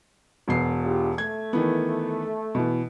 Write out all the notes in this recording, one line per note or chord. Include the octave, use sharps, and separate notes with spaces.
E1 B2 C7
D4 F4 G4
A3 G#6
D#3 E3 B3
B2 E3